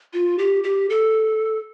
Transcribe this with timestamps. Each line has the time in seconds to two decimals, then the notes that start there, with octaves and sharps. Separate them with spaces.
0.13 F4
0.39 G4
0.64 G4
0.90 A4